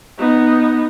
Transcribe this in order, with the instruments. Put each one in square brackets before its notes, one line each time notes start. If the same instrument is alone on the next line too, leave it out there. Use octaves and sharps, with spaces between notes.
[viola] B3 D#4